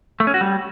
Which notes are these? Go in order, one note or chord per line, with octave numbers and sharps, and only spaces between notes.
A3
C#4
F#4
G3